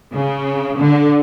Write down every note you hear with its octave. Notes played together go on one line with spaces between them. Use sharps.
C#3
D3